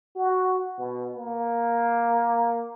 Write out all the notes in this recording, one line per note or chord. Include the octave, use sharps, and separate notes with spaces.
F#4
B2
A#3